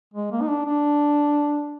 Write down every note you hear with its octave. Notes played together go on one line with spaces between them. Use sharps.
G#3
A#3
D#4
D4
D4